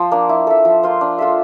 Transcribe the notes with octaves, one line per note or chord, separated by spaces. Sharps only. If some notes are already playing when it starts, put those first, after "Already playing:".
Already playing: F3 C5
A#3 D4
E4
A4 E5
F3
A#3 F4 C5
D4
F4 A4 E5